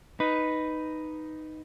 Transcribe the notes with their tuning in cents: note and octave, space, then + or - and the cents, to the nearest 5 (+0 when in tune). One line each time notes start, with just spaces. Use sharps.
D#4 +0 B4 +0